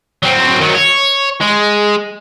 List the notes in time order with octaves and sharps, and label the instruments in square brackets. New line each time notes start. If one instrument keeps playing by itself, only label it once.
[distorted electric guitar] F#3 C4
D#3 F#3
C#5
G#3